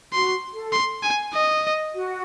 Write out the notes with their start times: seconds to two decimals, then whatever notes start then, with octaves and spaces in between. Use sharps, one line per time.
0.12 F#4 C6
0.53 A4
0.72 C6
1.03 G#5
1.33 D#5
1.93 F#4